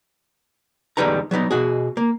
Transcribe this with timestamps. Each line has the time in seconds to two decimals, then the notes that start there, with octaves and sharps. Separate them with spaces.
0.97 E2 D3 G3 D#4 B4 A#5
1.31 F#3 G3 B3 D#4
1.51 B2 F#4 G#4
1.97 A#3